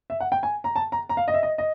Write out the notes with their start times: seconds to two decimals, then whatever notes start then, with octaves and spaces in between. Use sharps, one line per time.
0.10 E5
0.20 F#5
0.32 G5
0.43 G#5
0.64 A#5
0.76 A5
0.92 A#5
1.09 A#5
1.17 F5
1.28 D#5
1.34 E5
1.43 D#5
1.58 D#5